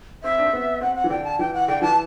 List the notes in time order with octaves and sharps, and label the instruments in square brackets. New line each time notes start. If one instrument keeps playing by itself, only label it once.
[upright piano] C4 [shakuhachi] E5
[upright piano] D4
C4
B3
[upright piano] C4 [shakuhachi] F#5
[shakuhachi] F#5
[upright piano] E3
[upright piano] D3 [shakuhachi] G5
[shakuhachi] A5
[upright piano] E3 [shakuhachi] G5
[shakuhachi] F#5
[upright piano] D3 [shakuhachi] G5
[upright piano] E3 [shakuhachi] A5